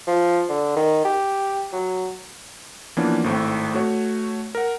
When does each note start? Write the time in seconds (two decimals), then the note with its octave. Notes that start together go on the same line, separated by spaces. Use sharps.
0.07 F3
0.49 D3
0.76 D#3
1.05 G4
1.73 F#3
2.97 E3 F3 A#3 B3 C#4 D4
3.24 G#1 A2 C4
3.74 A3 F#4 C#5
4.55 A#4 F#5